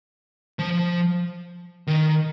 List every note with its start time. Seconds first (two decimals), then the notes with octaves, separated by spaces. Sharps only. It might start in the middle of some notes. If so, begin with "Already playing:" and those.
0.59 F3
1.87 D#3